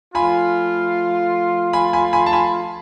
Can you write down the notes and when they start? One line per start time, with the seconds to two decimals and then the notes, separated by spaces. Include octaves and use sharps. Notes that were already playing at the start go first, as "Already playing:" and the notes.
0.14 F3 A3 F4 G#5 B5
1.73 G#5 B5
1.93 G#5 B5
2.13 G#5 B5
2.26 A5
2.33 G#5 B5